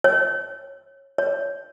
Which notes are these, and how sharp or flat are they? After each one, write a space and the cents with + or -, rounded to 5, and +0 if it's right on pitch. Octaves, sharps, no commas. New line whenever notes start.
C#5 -15
C#5 +20